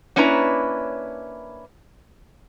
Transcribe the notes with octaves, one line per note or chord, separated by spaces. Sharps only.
A#3 C#4 D4 E4 B4 A#5